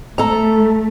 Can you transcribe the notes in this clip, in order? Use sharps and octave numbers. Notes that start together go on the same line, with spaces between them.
A3 A4 A#5